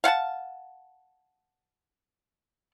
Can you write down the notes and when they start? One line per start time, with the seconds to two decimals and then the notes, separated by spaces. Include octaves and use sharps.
0.04 F5 F#5 G#5 A5